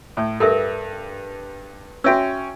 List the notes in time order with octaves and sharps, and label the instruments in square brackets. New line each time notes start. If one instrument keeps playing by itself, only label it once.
[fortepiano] A2
[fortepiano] G2 [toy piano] A4 A#4 E5
[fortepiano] C#4 G5 [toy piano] F#4 E5 E6